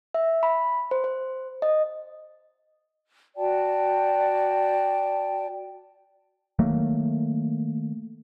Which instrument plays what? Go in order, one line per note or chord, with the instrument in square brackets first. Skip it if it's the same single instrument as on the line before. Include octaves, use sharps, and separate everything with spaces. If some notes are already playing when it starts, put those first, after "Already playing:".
[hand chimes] E5
B5
C5
C5
D#5
[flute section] F#4 D5 G5 A5
[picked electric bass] D#3 F#3 A3 A#3